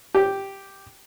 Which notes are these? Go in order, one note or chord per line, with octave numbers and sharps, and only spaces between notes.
G4